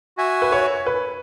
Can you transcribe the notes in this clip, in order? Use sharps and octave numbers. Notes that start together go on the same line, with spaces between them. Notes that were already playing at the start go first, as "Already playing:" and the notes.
F#4 E5 G#5
B4
C#5
B4